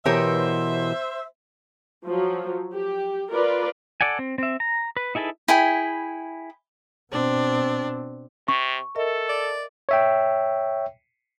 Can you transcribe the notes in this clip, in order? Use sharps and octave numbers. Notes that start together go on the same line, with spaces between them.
B2 E3 B3 G4 A#4 C5 C#5 E5
F3 F#3
G4
F4 A#4 B4 D5
A4 D5 F#5 G#5
C4
C4 E5
A#5
B4
D#4 E4 G#4 A4 B4
E4 G#4 G5 B5
B2 C4 D4
C3 C#6
A4 A#4 D#5 E5
D5
C#5 E5 G5